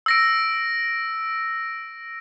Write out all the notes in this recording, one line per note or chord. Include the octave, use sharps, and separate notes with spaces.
E6 A#6 D7